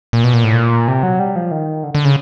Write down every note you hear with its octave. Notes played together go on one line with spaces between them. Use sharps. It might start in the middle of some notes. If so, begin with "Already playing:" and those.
A#2
B2
A#2
A2
A#2
C3
F#3
G3
F3
D#3
D3
D3
C#3